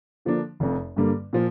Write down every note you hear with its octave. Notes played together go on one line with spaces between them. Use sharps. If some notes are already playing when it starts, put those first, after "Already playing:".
D3 F3 A#3 D4
F1 F2 C3
G2 D3 G3 A#3
A#2 F3